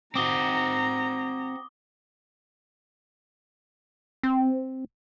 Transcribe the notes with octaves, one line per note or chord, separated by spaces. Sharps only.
C4 F#4 A#5 D6 D#6 G7
C4